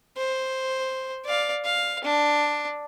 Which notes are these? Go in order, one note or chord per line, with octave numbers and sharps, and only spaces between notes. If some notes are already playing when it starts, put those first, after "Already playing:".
C5
D5 F5
F5
D4